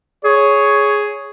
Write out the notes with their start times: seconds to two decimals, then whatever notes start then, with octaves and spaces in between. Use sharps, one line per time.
0.25 G#4 C#5